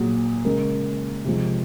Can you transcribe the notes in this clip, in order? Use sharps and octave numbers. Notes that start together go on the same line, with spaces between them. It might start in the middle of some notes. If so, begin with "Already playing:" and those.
Already playing: A#2 F#3 G#4
C#3 G#3 A#4
C3 F3 G#3